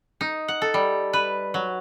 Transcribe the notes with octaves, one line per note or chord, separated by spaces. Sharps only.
D#4
F#5
A4
G3
B4
F#3